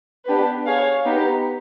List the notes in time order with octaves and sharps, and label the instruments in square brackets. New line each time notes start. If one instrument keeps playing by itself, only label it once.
[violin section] B3 D4 G4 B4
G#4 C#5 F5
B3 D#4 G4